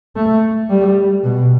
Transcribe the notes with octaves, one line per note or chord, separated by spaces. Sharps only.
A3
G3
B2